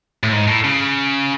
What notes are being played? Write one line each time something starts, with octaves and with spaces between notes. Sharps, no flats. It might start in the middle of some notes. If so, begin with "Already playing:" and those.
A2
G#2
A2
C#3